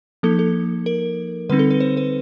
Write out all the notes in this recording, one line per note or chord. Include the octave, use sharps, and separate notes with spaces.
F3 A#3 D#4 A4
A4
A#4
D3 G3 C4 D#4 B4
A4
B4
C5
B4